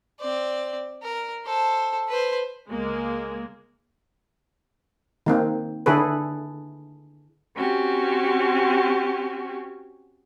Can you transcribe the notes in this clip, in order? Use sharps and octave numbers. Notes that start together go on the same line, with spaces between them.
C4 D5
A#4
A4 C5
B4 C5
C#2 G#3 A#3
D#3 A#3 C4
D3 E4 G#4 A4 B4
C4 C#4 F#4 G4